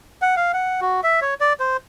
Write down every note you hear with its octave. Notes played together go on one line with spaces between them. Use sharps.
F#5
F5
F#5
F#4
E5
C#5
D5
C5